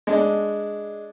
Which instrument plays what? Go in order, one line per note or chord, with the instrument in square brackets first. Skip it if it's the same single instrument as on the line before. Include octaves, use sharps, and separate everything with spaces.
[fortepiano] G#3 D4